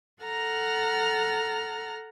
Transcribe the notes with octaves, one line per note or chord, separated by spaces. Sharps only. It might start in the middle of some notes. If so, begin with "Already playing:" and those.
A4 F#5 A#5 F6